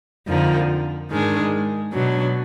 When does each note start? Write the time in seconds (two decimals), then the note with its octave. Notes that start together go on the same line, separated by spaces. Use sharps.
0.27 F2 D3 F3 A#3 D#4
1.09 G#2 D#3 G#3 D4
1.93 B2 F#3 D4